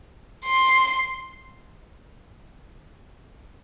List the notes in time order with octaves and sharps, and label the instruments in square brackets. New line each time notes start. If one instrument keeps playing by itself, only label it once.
[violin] C6